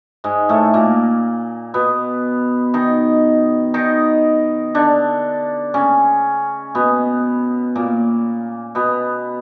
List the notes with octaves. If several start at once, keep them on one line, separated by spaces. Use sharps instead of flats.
G#2 G#3
A2 A3
A#2 A#3
B2 B3
D#3 D#4
D#3 D#4
D3 D4
C#3 C#4
B2 B3
A#2 A#3
B2 B3